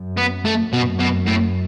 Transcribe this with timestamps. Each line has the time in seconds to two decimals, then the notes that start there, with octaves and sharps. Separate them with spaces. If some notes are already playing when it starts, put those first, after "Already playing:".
Already playing: F#2
0.17 B3
0.45 A3
0.72 F#2 B2
0.99 B2
1.26 A2